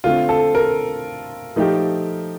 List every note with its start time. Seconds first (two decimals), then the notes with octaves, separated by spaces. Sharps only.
0.04 D3 A3 C4 F4
0.29 A4
0.55 A#4
1.56 F3 A3 D#4 G4